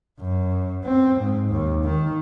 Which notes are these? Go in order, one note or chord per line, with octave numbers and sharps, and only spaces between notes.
F#2
C4
G#2
D#2
D#3